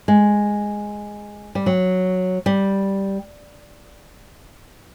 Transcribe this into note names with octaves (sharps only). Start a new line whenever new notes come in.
G#3
G3
F#3
G3